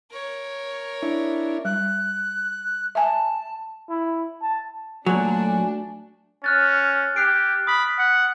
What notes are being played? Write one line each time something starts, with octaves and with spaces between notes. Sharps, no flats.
A#4 C#5
D4 E4
G3 F#6
E5 G#5 A5
E4
A5
A#2 F#3 A3 D4 F#4 G#5
C#4 F6 F#6 A6
G4 F#6 C7 D7
B5 D#6
F#5